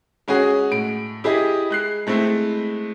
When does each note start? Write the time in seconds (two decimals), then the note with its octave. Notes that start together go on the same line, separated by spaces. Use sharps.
0.28 G#3 C#4 F#4 G#4
0.72 A2 D7
1.24 E4 G4 G#4 D#5
1.70 G#3 F#6 C7
2.07 G#3 A3 C4 E4